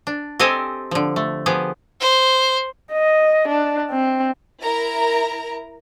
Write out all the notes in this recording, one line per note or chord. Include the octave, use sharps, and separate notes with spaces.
D4
C4 G4 A4 C5 D#5 G#5
D3 F3
A3
F3 B3 G4 G#4
C5
D#5
D4
C4
E4 A#4 A#5